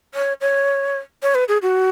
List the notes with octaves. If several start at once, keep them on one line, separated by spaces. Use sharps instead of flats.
C#5
C#5
C#5
B4
G#4
F#4